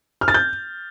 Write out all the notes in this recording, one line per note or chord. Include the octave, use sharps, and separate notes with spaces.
F6
A6
G6